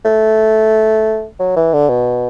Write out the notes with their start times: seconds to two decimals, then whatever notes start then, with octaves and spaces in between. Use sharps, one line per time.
0.05 A3
1.40 F#3
1.56 E3
1.73 D3
1.89 B2